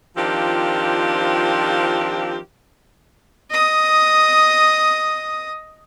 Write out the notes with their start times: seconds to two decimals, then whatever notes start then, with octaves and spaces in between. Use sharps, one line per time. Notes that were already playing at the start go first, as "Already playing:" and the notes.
0.17 D#3 F3 C4 D4 F4 G4
3.51 D#5 D#6